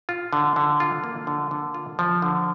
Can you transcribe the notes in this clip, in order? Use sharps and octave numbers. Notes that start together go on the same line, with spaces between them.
F4
D3
D3
F4
A#3
D3
D3
F4
F3
D3